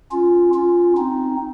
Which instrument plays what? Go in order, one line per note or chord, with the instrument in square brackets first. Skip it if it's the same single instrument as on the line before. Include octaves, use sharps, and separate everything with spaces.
[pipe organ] C#4 F4
C#4 F4
C4 D#4